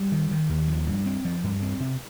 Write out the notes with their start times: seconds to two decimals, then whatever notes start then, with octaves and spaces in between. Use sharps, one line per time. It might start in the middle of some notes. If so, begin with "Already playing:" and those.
Already playing: G3
0.12 D#3
0.31 D#3
0.49 D#2
0.68 F3
0.87 G2
1.06 C4
1.25 F3
1.44 G2
1.62 C4
1.80 C3